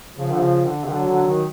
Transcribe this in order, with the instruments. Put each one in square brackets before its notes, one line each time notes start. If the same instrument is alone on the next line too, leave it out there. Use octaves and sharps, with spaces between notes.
[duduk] C#3 [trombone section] F3
[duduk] D3
C#3
D3
C#3
[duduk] D3 [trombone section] F#3
[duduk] D3
D#3